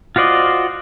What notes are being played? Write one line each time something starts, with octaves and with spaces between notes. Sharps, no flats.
F4 F#4 C5 D5 D#5